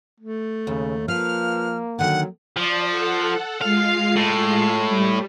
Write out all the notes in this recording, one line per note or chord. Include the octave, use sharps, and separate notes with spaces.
A3
D#2 C#3
F3 A#3 B4 F5 F6
D3 D#3 F#3 F#5
F3 D5
A4 F#5
G#3 F4 F5 C7
A2
G3